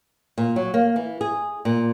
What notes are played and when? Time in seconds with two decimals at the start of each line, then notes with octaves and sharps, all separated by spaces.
0.38 A#2
0.56 F#3
0.74 A#3
0.96 E3
1.21 G#4
1.65 A#2